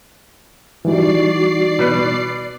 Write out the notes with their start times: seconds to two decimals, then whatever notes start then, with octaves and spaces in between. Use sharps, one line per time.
0.85 E3 G3 D#4 F#4 D5 C7
1.79 B2 B4